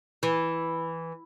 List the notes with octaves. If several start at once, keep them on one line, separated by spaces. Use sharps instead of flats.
E3